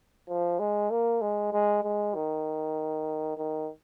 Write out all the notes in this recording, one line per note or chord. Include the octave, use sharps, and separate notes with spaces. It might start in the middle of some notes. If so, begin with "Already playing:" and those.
F3
G#3
A#3
G#3
G#3
G#3
D#3
D#3